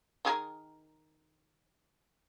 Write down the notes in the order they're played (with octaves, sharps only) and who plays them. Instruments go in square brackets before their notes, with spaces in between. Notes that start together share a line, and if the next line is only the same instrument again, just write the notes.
[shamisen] D#3 G#4 A#4